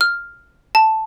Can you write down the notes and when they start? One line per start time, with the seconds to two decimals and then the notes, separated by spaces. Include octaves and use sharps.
0.01 F6
0.75 A5